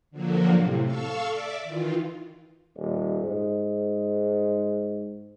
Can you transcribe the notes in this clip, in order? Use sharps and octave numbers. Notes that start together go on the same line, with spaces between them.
D3 F3 F#3 A#3 F#4
A2 C3
A4 F5 C#6 E6
D5 E5 D6
D#3 E3 F4
D#1
G#2